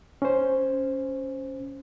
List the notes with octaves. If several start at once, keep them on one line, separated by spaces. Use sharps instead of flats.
C#4 C5